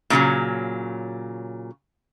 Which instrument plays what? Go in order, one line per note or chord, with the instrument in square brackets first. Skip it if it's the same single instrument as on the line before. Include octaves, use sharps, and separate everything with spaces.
[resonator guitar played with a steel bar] A#2 C#3 E3 F#3